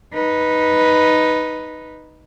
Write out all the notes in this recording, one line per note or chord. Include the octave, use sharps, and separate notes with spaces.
D#4 B4